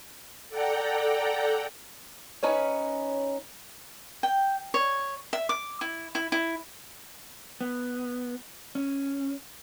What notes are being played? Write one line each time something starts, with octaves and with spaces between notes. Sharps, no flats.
A4 D5 F#5 G5 A#5
C#4 D#4 B4 C#5
G5
C#5
E5
D6
E4
E4
E4
B3
C#4